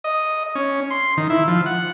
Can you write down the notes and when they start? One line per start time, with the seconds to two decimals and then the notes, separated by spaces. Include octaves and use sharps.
0.04 D#5
0.55 C#4
0.90 C6
1.17 D#3
1.30 E4
1.48 F3
1.66 F#5